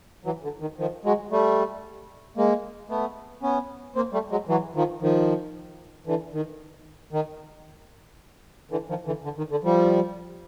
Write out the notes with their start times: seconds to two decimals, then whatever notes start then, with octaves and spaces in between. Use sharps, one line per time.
0.25 E3 F#3
0.43 D3
0.61 D#3
0.78 D#3 F3
1.04 F#3 G#3
1.31 G3 A3
2.37 G#3 A#3
2.89 A3 B3
3.42 B3 C#4
3.95 A#3 C4
4.13 G3 A3
4.31 F#3 G#3
4.48 E3 F#3
4.75 D#3 F3
5.02 D#3 F3
6.07 D3 E3
6.33 D#3
7.13 D#3
8.71 D3 E3
8.89 D#3 F3
9.06 D3 E3
9.24 D3
9.37 D#3
9.51 D3
9.64 F3 G3